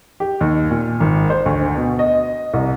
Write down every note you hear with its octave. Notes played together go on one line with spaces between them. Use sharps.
G4
D#2
A#2
G#1
C5
D2
B2
D#5
C2